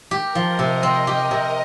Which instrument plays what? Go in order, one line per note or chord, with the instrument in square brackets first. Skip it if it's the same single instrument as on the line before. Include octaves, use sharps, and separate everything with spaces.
[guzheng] G4 [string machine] A#4
[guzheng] F3
[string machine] D#5
[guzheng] C3
[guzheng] C4 [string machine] D#5
[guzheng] G4
C3